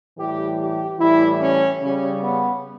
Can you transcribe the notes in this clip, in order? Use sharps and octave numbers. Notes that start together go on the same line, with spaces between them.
A2 E3 G3 G4
G4
A2 E3 G3 E4
C#4
C#3 G3 C#4
B3